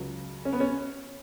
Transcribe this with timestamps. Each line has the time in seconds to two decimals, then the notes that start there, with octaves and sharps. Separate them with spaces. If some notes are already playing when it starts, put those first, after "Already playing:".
Already playing: C#2 C#3 F#3
0.45 C#4
0.53 B3
0.60 C#4